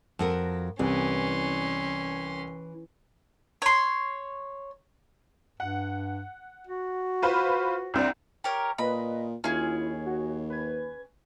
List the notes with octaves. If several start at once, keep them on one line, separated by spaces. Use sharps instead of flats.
F2 F#4 A#4
C2 E3 C#4 C6
C#5 C6
G2 F#5
F#4
F4 B4 C5
C2 C4 D4
G4 A#4 C#5
A#2 B4 D#5 B5
D#2 C#4 E4 F4 G#4
F#4
B4 G#6